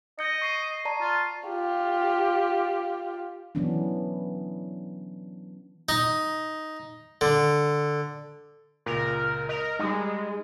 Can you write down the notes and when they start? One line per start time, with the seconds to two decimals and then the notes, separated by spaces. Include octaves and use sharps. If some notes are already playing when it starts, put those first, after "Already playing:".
0.19 D#5 G6 C#7
0.42 C#6 C7 D#7
0.85 D5 A5 A#5
1.01 F4
1.48 F4 G4
3.55 E3 F#3 B3 C#4 D4
5.89 D#4
7.21 D3
8.86 C#2 A#2 A#4
9.49 A#4 D#5
9.79 G3 G#3 D#4